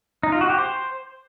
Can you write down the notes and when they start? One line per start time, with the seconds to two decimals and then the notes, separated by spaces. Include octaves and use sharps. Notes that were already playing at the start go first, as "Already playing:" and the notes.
0.23 D#4
0.32 F4
0.41 F#4
0.50 G4
0.59 C5